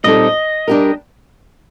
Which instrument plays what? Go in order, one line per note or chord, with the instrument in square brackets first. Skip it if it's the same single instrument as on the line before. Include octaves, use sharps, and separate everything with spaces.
[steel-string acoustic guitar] A#2 G3 C4 D#4 A4 [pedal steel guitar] D#5
[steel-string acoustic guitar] G3 D4 G4 A#4